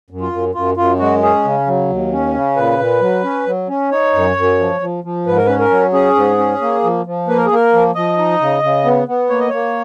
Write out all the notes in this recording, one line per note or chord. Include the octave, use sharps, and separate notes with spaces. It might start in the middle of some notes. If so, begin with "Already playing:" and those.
F#2
F4
F#2
F#2 F4
F#2 F4
G#3 F#4
C#4 G#4
C#3
F#3
D#2
C#4
C#3
A#2 B4
A#2
F#3
C#4
F#3
C#4
D#4 C#5
F#2
F#2
F3
F3
F3
G#2 B4
A#4
C#4 B4
A#4
F#3
C#4 G#4
G#2
C#4
A#3
F3
F3
A#3 B4
A#4
G#4
A#3 A#4
F3
F3 D#5
D#4
C#3
C#3
B3
B3
A#3 C#5
D#5
A#3 C#5